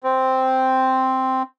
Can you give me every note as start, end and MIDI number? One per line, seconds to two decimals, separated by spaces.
0.04 1.43 60